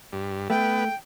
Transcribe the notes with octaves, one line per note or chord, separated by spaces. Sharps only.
G2
A3 B3 G5